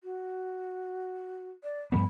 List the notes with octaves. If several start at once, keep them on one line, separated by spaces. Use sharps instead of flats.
F#4
D5
G2 F3 B3 B5